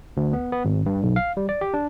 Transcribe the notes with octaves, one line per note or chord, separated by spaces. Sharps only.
D2
B3
B3
G#1
G2
B1
F5
G3
D5
G4
D4